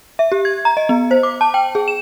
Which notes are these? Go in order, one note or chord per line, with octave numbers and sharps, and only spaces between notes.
E5
G4
G#6
A#5
D#5
B3
C5
D6
A5
G5
G#4
E7